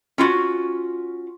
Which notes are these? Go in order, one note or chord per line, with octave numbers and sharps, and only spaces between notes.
C#4 F4 F#4